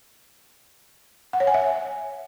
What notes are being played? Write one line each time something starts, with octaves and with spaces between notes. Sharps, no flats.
F#5
C#5
G#5
E5